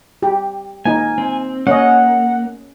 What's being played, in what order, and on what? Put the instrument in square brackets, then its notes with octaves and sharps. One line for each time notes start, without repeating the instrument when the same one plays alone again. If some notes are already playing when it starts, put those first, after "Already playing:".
[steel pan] G4
[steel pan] A#3 D#4 [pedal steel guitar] G#5
[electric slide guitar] C4
[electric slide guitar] A#3 [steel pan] C#4 D#5 [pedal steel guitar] F#5